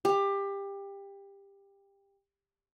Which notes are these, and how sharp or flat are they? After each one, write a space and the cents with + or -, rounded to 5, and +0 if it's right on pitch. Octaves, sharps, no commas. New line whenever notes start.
G4 +20